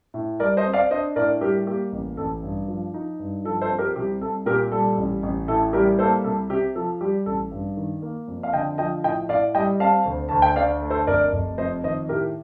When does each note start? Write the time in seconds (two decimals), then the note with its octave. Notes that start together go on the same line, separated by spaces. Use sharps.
0.14 A2
0.40 G3 A#4 D5
0.57 C5 D#5
0.65 C4
0.73 D5 F5
0.90 D4 C5 D#5
1.16 A2 A#4 D5
1.41 G3 G4 A#4
1.67 A#3 G4
1.92 A1
2.17 A1 A4
2.43 G2
2.68 F3
2.94 D#4
3.19 G2
3.45 F3 A4
3.61 A4 C5
3.70 C4
3.78 G4 A#4
3.96 C2 G4
4.21 C2 A4
4.46 A#2 G4 A#4
4.72 G3 A4
4.97 A1
5.23 A1
5.48 A2 A4
5.73 G3 G4 A#4
5.99 A#3 A4 C5
6.24 C2 A4
6.49 C3 G4
6.75 F3 A4
7.01 G3 G4
7.26 A1 A4
7.51 G2
7.77 D#3
8.02 A#3
8.28 F2
8.43 F5
8.53 D3 D#5 G5
8.78 F3 D#5 G5
9.04 A2 D#5 G5
9.29 A2 D5 F5
9.55 G3 D#5 G5
9.80 C4 F5 A5
10.05 D2
10.29 D2 A5
10.42 G5
10.56 D3 D5 F5
10.82 A3
10.90 A4 C5
11.07 F1 A#4 D5
11.33 F1
11.58 F2 C5 D#5
11.84 D#3 C5 D#5
12.09 A2 G4 A#4